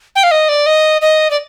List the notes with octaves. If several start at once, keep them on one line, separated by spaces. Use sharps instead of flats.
G5
F5
D#5
D5
D#5
D#5
D5